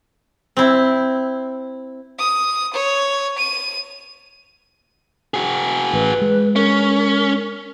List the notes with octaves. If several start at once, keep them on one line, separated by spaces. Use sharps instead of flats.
C4 E4
D#6
C#5
D#7
F#4 G#4
A1 B4
G#3
C#4 A#4